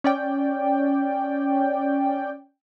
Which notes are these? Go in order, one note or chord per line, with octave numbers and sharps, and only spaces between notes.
C#4 D5 G5